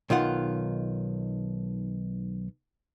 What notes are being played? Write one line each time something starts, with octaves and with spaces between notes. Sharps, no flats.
B1 D#3 F4 F#5